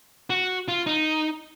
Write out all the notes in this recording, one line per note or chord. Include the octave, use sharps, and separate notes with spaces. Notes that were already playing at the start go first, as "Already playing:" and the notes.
F#4
F4
D#4